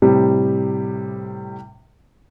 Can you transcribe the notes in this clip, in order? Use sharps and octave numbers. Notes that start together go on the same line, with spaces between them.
A2 C3 G3